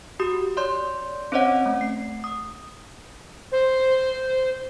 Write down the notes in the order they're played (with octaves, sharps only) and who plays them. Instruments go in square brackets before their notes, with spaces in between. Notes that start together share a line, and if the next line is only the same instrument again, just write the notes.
[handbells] F#4 G4 D#6
C#5 D5 C6 G6
C4 C#4 C5 C#5 D#5 F#5
A3
C7
D#6
[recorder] C5